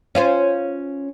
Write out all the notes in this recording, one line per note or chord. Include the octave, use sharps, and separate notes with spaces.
C#4 F4 C5